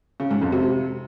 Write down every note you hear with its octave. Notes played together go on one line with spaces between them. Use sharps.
C#3
G#2
F2
C3